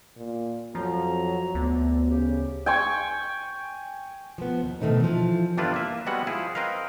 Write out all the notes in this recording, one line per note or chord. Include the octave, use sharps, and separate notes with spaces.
A#2
F2 F3 F#3 A#5
D2 B3
C#3 G4
G5 G#5 C#6
F3 B3
D#2
B2 D#3 A3 C4 D#4
E3 F3
G1 G3 D4 E4 F4 B4
A#3 E5
G3 G#3 B3 C4 F#4 F#5
F3 E4 G#4
C4 A#4 B4 D#5 F5